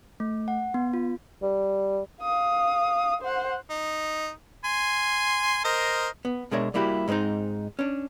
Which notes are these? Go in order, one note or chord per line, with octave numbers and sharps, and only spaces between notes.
A3
F#5
B3
F4
G3
F5 D#6
C5 F#5
D#4
G#5 C6
A#4 C5 D#5
B3
B2 G#3 D4 A#4 C#5 E5
G3 A#3 E4 F#4 G4
G#2 G#3 B3 C4 D#4
C#4 D4